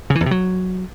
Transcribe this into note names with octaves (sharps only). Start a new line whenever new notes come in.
C#3
E3
E2
C3
F#3